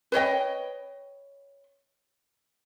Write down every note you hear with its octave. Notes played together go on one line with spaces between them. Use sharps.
B4 C#5 D#5 G5